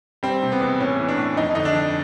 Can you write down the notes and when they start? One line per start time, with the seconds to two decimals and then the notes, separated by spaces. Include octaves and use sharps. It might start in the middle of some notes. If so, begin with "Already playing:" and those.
0.23 G3 C4
0.43 C3
0.52 B3
0.61 E2
0.80 A2 C#4
0.99 E3
1.09 D4
1.18 A2
1.37 F2 D#4
1.55 D3 D#4
1.65 D4
1.75 F2